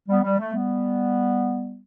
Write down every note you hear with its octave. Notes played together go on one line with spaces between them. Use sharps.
G3 B3
G3
A3
G3 B3